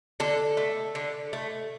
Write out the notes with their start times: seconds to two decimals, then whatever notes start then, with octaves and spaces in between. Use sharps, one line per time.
0.20 D3 A4
0.57 A3
0.95 D3
1.33 A3